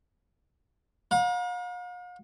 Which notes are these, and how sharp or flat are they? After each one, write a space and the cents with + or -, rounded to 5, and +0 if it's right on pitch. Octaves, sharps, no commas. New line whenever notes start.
F5 +45 A#5 +45